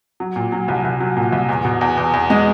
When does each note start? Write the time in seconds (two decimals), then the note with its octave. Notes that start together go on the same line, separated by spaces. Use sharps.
0.20 F#3
0.36 A#2
0.52 F#3
0.68 C2
0.84 C2
1.00 F#3
1.17 A#2
1.32 C2
1.49 E2
1.65 B2
1.81 E2
1.97 E2
2.14 E2
2.30 G#3